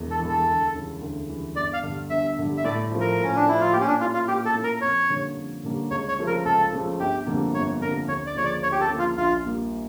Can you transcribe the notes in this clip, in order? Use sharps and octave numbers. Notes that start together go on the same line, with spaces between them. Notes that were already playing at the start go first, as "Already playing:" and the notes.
Already playing: E1 E2 E3
A4
E2 E3
A4
D2
C#3 E3 G3
D2
C#3 E3 G3
G1 D5
F5
G2 D3 G3
G1 E5
G2 D3 G3
E5
A2 D5
F3 A3
A#4
A2 C#4
D4
F3 A3 E4
F4
A#2 G4
C#4
D4
A3 C#4 E4 F4
F4
A#2 G4
A4
A3 C#4 E4
A#4
F2 C#5
D3 G3 A#3 C#4
F2
D3 G3 A#3 C#4
C#2 C#5
C#5
C#3 F3 A3
A#4
C#2 A4
C#3 F3 A3
G1 G4
F2 D3 G3 A#3
G1 C#5
F2 D3 G3 A#3 A#4
D2 C#5
D5
C#3 F3 A#3 C#4 C#5
D5
D2 C#5
G4
A4
C#3 F3 A#3 C#4
F4
A#1 F4
A#2 G3 A#3